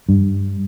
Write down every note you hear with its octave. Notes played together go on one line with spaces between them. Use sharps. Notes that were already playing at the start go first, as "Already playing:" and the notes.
G2